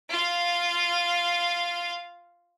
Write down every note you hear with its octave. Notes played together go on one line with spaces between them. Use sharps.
F4 F5